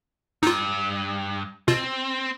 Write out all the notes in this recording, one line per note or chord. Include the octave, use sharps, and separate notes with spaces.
G2 D#4 F4
B2 C4 F4